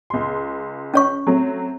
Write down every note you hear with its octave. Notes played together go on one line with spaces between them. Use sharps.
C#2 C6
C#4 C#5 C#6
F#3 A3 C4